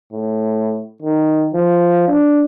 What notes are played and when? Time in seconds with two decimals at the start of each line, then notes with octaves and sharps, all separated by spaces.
0.13 A2
1.02 D#3
1.54 F3
2.08 D4